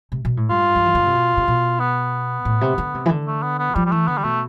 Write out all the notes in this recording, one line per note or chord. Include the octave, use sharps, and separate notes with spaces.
C3
B2
A2
G2 F4
F3
E3
D3
C3
B2
C3
B2
B3
A2
C3
D3
C3
E3
D3
A3
B3
B3
F3 G3
G3
E3 A3
D3 B3
G3
B2 A3